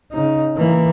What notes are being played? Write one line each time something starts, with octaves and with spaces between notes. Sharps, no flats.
C#3 D#4
E3 A#3